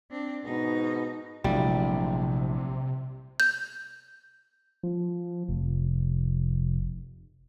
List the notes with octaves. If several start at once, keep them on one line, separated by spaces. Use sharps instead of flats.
C4 D4
G#2 B2 D#4
A#1 C3 F#3 G3 A3 E4
G6
F3
F1